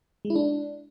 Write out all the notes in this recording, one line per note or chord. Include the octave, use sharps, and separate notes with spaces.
G#3
E4
D4